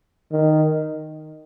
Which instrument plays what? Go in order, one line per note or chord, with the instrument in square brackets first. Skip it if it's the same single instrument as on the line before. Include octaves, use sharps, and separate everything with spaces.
[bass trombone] D#3